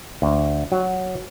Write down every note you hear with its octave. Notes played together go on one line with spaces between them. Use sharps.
D2
F#3